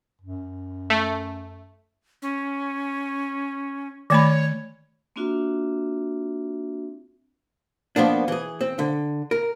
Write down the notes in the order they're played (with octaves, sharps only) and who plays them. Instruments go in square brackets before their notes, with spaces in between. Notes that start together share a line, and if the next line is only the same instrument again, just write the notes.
[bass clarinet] F#2
[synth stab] A3
[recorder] C#4
[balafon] D#3 A3 B5 [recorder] C#5
[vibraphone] A#3 C4 D4 F4 F#4 E5
[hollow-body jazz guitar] F3 A#3 B3 D4
E3 G#4
C4
D3
A#4